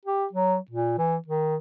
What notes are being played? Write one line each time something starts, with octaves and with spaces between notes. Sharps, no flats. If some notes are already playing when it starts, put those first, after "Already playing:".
G4
F#3
A#2
E3
D#3